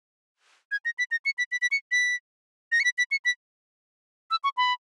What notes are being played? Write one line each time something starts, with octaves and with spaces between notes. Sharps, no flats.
G#6
A#6
B6
A#6
C#7
B6
B6
B6
C#7
B6
A#6
C#7
B6
B6
C#7
B6
E6
C#6
B5